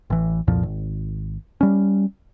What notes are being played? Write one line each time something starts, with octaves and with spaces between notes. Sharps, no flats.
A1 E3
C2 F2 A#2 F3
G#1
G3 C#4